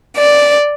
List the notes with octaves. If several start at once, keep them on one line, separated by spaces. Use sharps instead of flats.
D5